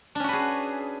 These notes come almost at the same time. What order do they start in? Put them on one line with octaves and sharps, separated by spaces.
D4 C#4 F#4 B4 G#4